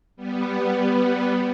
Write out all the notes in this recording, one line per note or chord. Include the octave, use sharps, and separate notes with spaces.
G3 B3